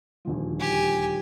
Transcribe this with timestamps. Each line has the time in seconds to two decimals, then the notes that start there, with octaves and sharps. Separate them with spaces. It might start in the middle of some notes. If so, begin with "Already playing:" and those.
0.25 D#1 D2 F3
0.60 G4 G#5